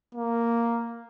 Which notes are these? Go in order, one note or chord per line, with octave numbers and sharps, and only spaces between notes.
A#3